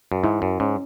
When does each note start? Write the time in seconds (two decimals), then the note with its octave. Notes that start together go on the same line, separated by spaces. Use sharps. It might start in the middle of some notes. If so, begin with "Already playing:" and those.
0.12 F#2
0.24 G#2 E4
0.42 F#2
0.60 G#2 C#4